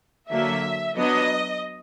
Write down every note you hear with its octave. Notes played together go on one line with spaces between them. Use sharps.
D3 F#3 A#3 E5
F#3 B3 D4 D#5